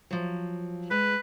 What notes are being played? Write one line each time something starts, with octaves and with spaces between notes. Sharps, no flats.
F3 F#3
G#3 B4